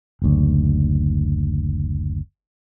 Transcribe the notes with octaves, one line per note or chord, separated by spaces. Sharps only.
F#1 D2